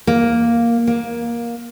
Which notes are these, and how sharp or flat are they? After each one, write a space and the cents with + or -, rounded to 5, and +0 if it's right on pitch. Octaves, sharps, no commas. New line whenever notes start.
A#3 +0
A#3 +15